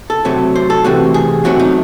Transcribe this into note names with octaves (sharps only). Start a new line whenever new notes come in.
A4
C3 F#3 A3
C5
A4
C3 E3 A3 F#4
G#4
C3 F#3 A3 F#4
D#4